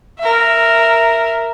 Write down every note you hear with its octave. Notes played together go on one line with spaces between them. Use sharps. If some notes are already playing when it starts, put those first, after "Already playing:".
A#4 E5